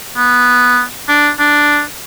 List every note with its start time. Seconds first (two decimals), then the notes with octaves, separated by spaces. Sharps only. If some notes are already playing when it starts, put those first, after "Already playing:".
0.17 B3
1.09 D4
1.39 D4